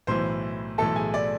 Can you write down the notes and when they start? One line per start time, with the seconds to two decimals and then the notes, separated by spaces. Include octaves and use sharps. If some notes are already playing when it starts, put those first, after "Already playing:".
0.07 B1 A2 E3 C5 C6
0.78 B1 A2 E3 A4 A5
0.96 G#4 G#5
1.14 D5